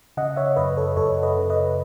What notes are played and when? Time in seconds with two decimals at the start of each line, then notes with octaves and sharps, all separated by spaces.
0.17 C#3 D#5 F#5
0.36 C#5 E5
0.56 F#2 B4 D#5
0.77 A4 C#5
0.96 F#2 A4 C#5
1.23 B4 D#5
1.37 C#3
1.50 B4 D#5